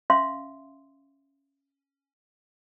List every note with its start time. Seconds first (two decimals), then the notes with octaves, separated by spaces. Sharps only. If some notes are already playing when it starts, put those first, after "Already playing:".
0.10 C#4 E5 F5 C6